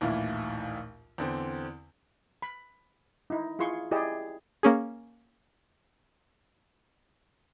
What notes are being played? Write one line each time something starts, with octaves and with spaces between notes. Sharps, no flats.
A#1 D#2 A2 E3 E4 F5
E2 D3 C4
B5
D#4 E4
E4 F4 G#4 C6 C#6
E4 G4 G#4 D5 D#5
A#3 C#4 G#4